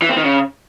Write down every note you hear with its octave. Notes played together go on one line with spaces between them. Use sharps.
E3
C4
D#3
C#3